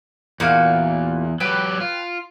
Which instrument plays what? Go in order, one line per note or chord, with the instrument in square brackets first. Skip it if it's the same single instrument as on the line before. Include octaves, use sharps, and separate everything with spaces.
[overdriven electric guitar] E2 [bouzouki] A#2 F#4 F5
[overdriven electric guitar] F#3 G4 [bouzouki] B4 G5 A5
[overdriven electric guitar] F4